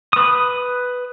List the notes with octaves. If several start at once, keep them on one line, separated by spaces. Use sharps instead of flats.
B4 D#6